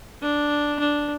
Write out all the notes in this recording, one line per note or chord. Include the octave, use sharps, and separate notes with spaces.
D4
D4